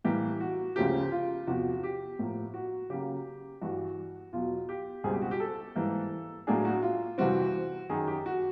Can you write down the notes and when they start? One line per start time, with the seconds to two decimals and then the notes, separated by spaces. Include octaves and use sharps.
0.04 A2 E3 G3 A#3 G4
0.40 F#4
0.76 D2 C#3 F3 A#3 G4
1.12 F4
1.47 E2 C3 F3 F#4
1.83 G4
2.19 A2 F3 A#3
2.54 F#4
2.90 C#3 F#3 A#3 G4
3.62 G2 E3 G3 F#4
4.33 E2 B2 F#3 F4
4.69 G4
5.04 C#2 B2 G3 C4 G#4
5.13 G4
5.22 F#4
5.31 G4
5.40 A4
5.76 G#2 E3 G3 A#3
6.47 A2 F#3 A#3 D4 G#4
6.65 F#4
6.83 F4
7.18 F2 C3 E3 G3 C4 F#4
7.89 F#2 D#3 F#3 G#4
8.07 G4
8.26 F#4